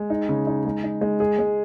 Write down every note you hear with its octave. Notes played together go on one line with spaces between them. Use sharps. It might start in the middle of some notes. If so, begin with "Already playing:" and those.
Already playing: G#3
D#4
C#3
D#4
G#3
D#4
G#3
G#4
G#3